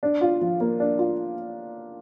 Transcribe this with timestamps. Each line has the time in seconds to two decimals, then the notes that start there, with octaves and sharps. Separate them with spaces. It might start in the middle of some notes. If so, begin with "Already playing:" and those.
0.03 D4
0.21 F4
0.41 F3
0.60 A#3
0.80 D4
0.99 F4